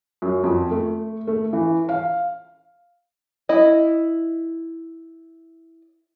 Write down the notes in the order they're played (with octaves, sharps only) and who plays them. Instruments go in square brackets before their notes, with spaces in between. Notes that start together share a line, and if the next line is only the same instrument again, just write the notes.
[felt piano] F#2
F2
A3
A3
E3
F5
[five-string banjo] E4 D#5